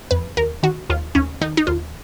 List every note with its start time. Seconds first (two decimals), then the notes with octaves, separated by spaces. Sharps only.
0.11 F2 B4
0.37 D#2 A#4
0.63 D#3 F#4
0.90 D#2 F4
1.15 D#2 C#4
1.41 D#3 D#4
1.57 D#4
1.67 D#2 F4